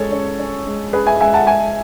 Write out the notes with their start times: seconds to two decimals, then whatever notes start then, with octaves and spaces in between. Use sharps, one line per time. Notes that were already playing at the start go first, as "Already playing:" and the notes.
Already playing: G#3 C#4 A4 C#5
0.12 C#4
0.39 C#4
0.67 G#3
0.93 C#4 G#4 B4
1.07 E5 G#5
1.21 G#3 E5 G#5
1.34 F#5 A5
1.47 G#3 E5 G#5